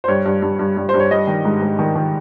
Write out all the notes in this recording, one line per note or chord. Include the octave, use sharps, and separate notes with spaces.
C5
G2 C#5
G2
G2
G2
G2
C5
G2
C#5
G3 D#5
D#3
G#2
G#2
D#3
D#3